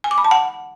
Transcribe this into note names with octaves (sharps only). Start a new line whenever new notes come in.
G#5
D6
B5
A5
F#5